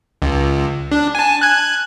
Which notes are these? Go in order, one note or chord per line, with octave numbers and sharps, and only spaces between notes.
C#2
D4
G#5 A5
F#6 G#6